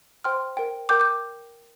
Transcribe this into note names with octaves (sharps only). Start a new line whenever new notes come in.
C5 G5 C6 F6
A#4 G5
A#4 G5 D6 G6
D6 G6